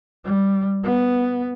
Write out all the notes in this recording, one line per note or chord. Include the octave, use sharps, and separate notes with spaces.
G3
B3